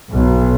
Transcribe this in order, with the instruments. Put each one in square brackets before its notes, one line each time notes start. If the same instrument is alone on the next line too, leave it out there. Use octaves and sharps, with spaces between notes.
[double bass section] B1